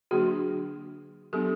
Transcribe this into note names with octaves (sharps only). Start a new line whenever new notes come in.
D3 F#3 A#3 D4 F#4 G#4
F#3 B3 D4 G4 A4